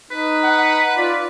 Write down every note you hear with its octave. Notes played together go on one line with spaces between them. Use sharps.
D#4 B4
F#5
F4 D5